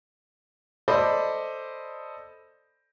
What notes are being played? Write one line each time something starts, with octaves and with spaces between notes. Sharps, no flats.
A4 C5 D5 D#5 B5 D6